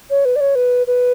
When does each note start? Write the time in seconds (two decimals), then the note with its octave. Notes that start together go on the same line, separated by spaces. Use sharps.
0.10 C#5
0.25 B4
0.36 D5
0.40 C#5
0.55 B4
0.87 B4